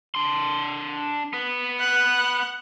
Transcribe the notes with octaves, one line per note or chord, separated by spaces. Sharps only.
D4 C6
B3 B4
F#5